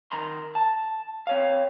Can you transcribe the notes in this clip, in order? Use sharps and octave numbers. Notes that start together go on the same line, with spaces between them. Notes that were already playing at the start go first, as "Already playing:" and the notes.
D#3 A#5 C6
A5
C4 C#5 F5